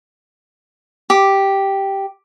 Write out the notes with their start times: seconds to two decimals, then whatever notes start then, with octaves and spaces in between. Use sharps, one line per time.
1.10 G4